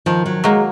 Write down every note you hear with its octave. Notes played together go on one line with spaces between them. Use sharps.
D#3 F3
F#3
F#3 G#3 A#3